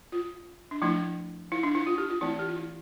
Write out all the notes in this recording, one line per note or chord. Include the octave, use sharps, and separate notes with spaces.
F4
D4
F3 A3 D4 E4
E4
D4
E4
F4
G4
F4
E3 A3 C4 E4
G4
F4
E4